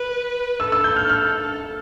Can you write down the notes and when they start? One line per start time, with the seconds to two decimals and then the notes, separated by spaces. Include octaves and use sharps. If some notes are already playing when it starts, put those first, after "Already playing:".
Already playing: B4
0.60 A4 E6
0.72 E6
0.84 G6
0.96 F6
1.09 F6